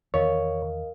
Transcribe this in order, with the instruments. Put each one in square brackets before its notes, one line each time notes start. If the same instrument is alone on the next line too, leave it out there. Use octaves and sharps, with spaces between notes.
[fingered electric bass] E2 D#3 E3 [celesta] A#4 D#5 F5 [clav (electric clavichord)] C#5